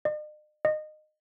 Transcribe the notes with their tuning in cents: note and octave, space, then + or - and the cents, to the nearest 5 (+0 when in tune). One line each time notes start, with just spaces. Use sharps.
D#5 -45
D#5 -20